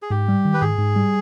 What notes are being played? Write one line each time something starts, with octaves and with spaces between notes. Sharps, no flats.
G#4
G#2 G4
G3
D#3
B4
G#2 G#4
G#2
G3